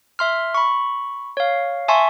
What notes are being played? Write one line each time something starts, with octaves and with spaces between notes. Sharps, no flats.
E5 C6 F6
B5 C#6
C#5 F5
E5 G#5 A5 C6 C#6